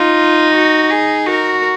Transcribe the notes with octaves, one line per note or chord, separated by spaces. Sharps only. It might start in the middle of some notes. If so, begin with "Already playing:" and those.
Already playing: D#4 F4
F#4
G#4
F#4 A#4